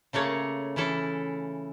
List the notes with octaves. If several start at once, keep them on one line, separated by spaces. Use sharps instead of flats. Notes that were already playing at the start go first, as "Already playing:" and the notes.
C#3 A3 A#3 C#5
E3 C#4 E4 A4